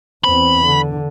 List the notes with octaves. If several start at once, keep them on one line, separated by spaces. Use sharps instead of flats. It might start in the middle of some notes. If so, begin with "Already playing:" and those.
E2 C4 B5
D3